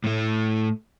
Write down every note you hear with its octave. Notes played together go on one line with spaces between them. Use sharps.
A2 A3